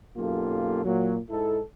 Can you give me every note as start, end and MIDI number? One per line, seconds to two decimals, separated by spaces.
0.17 0.82 35
0.17 0.82 42
0.17 0.82 58
0.17 0.82 65
0.17 0.82 67
0.17 0.82 69
0.85 1.18 46
0.85 1.18 54
0.85 1.18 58
1.30 1.59 44
1.30 1.59 63
1.30 1.59 64
1.30 1.59 69